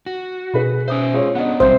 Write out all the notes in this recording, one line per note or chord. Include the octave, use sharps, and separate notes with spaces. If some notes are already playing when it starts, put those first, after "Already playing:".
F#4
B2 G#4 B4 B5
C#4 C5 E5 D#6
G#3 F4 C#5
B3 D4 D#5 F#5
A1 B2 F#3 G3 C4 C5 E5 G6